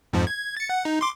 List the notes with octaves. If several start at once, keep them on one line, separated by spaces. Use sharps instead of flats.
F2 G#2 F3
G#6
A6 C#7
F#5
D#4
C6 D6